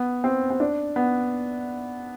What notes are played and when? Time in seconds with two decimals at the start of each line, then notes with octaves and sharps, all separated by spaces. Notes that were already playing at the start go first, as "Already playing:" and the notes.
Already playing: B3
0.24 C4
0.50 C4
0.60 D4
0.96 B3